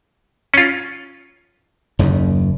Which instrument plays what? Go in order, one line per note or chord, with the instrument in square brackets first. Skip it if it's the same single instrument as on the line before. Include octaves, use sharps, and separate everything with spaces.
[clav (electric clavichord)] C#4 F4
[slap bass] F#1 D#2